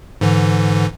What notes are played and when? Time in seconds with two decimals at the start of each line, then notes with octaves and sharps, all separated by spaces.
0.21 G#2 D3 E3